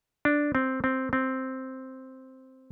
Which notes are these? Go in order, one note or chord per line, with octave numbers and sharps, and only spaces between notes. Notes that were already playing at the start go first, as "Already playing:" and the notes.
D4
C4
C4
C4